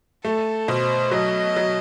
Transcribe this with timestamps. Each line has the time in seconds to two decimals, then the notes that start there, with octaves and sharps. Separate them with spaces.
0.24 A3 A4
0.68 B2 C5
1.11 F#3 D#5
1.56 F#3